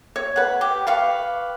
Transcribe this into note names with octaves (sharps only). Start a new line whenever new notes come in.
C#5
B4 F#5
G4
B4 F5 C#6